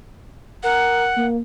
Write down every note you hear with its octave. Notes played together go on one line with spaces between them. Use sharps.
A#4 F#5
A#3